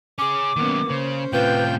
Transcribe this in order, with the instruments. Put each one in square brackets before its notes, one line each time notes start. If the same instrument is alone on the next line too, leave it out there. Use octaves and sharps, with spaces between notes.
[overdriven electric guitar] C#4 G#4 [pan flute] D6
[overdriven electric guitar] D#3 F#3 [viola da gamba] A#3 B3 C#4
[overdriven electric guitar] C#3 [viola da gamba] C#4 C5
[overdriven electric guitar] A2 C3 [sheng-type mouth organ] F4 G5 G6 [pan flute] B4